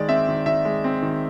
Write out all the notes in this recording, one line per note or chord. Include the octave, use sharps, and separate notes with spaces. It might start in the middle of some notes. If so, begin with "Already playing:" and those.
Already playing: D#3 G#3 D5
C4 E5
D#3
D#3 E5
G#3
C4
D#3